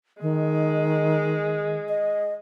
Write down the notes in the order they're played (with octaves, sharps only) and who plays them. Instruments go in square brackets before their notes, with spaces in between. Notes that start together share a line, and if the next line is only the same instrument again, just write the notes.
[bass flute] D#3 [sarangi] G#3
[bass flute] D#5